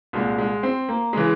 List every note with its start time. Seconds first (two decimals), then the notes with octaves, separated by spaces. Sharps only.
0.13 C2 A#2 G#3
0.38 G#3
0.63 C4
0.89 A#3
1.13 C#3 E3 G#3